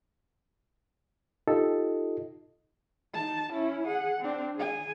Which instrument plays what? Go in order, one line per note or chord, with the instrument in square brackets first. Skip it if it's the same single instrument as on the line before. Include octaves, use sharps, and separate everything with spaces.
[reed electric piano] D#4 F4 G4 A4 D#5
[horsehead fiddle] D#4 A5
C#4 E4
G#4 F#5
C4 D4
G#4 G#5